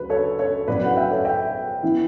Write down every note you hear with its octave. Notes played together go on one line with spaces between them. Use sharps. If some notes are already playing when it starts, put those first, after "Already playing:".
Already playing: D2 C#3 F#3 B4
A4 C#5
A4 C#5
A1 G2 F#3 B3 B4 D5
F#5
E5 G5
A4 C#5
E5 G5
E3 B3 E4